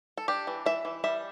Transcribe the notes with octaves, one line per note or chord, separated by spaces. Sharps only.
A4
D4 G4
E3
E3 E5
E3
G3 E5